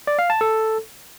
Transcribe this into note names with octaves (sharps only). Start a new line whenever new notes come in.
D5
F5
A5
A4